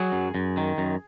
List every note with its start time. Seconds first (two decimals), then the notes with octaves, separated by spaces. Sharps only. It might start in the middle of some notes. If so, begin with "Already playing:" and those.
Already playing: F#3 G#4
0.12 F#2
0.35 F#2
0.57 D#3
0.78 F#2